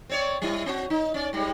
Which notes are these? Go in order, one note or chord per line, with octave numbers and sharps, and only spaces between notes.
C4 C#5 D5
G3 E4
C4 F#4
D#4
C#4 D5
G#2 G3 G#3